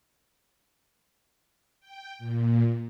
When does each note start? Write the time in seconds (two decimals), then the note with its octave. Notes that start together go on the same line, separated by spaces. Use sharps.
1.80 G5
2.19 A#2